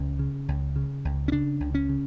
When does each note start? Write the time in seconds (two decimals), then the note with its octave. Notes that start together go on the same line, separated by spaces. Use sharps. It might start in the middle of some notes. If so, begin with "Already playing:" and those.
Already playing: C#2 C#4
0.19 C#3
0.48 C#2
0.76 C#3
1.05 C#2
1.28 C#4
1.32 C#3 D4
1.60 C#2
1.74 C#4
1.89 C#3